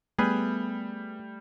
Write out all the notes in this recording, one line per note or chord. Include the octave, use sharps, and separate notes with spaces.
G3 A3 B3 G#4 B4